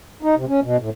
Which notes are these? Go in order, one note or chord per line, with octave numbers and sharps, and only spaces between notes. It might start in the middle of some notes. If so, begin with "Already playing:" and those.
D#4
C3
C#4
B2
A2